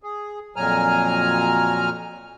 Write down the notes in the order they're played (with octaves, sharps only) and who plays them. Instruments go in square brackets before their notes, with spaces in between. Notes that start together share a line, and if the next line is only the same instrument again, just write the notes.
[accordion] G#4
F2 A#2 F#3 G#5 A#5 F6